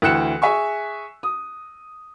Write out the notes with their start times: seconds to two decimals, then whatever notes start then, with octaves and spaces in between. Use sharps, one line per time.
0.02 D2 E3 G5 F#6 C#7 E7
0.42 G#4 E5 G#5 C#6
1.23 D#6